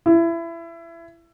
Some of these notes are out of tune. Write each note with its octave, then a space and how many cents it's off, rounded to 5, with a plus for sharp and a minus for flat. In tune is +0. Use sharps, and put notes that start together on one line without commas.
E4 +25